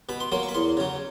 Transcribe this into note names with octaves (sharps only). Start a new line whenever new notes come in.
B2 B5
C6
F#3 A#3 C6
C#6
B5
E2 C6
C#3 F#3